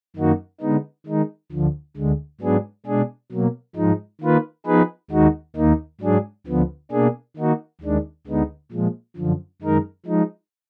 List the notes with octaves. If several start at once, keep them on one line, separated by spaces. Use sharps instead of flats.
F#2 D#3 A#3 D#4 F#4
D3 G#3 B3 D#4
D#3 G#3 D#4
D2 D3 F3
D2 D3 G#3
G#2 F#3 B3 D4 G#4
B2 G#3 D4 G#4
B2 F#3 A#3
G#2 F3 G#3 D#4
D#3 A#3 F4 B4
F3 B3 D#4 G#4 B4
D#2 D#3 G#3 D#4 F#4
D#2 D#3 A#3 D#4
G#2 F#3 D4 G#4
D2 D3 F3 B3
B2 A#3 D4 G#4
D#3 A#3 D#4 F#4
D#2 D#3 G#3 D4
D2 D3 G#3 B3 D#4
A#2 F3 G#3
F#2 D3 F3
F#2 D#3 G#3 D#4 A#4
F3 G#3 D#4